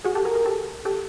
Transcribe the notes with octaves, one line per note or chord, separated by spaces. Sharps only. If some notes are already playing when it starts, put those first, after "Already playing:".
F#4 G#4
G4 A4
G#4 A#4
G#4 A#4
G4 A4
G4 A4